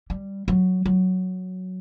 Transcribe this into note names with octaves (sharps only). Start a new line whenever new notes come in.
G3
F#3
F#3